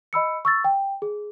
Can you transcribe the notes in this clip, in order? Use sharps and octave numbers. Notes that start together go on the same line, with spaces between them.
D#5 B5 E6 C#7
C#6 E6 A6
G5
G#4